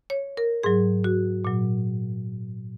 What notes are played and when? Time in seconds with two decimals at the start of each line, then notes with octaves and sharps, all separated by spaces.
0.10 C#5
0.37 A#4
0.63 G#2 F#3 G#4
1.04 F#4
1.45 A#2 F#3